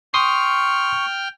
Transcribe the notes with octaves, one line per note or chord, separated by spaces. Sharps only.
G5 C6 C#6 D#6 F6 C7